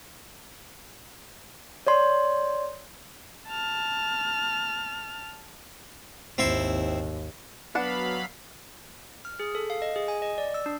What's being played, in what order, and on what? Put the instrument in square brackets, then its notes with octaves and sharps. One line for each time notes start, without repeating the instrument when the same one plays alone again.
[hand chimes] C#5 D5 C6
[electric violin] A5 F6
[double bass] G#1 D#2 [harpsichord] C4 E4 C6
[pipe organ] F#3 F5 B5 [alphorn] B3 [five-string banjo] D4 F#5
[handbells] F6
G#4
A4
F5
D#5
G#4
G#5
D#5
D5
E6
D4